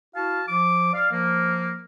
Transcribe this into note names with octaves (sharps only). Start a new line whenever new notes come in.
E4 F#4 F5 A5
F3 D6
D5 F5
F3 A#3